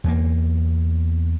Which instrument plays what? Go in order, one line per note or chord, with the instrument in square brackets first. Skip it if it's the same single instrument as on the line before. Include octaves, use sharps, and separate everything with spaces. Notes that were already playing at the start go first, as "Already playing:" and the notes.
[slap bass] E2 A#3